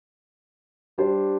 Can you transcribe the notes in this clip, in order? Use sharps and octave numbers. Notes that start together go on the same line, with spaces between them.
G3 D4 G4 C5